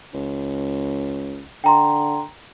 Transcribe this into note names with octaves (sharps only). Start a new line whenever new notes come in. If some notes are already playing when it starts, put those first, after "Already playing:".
C#2
D3 G5 A#5 C6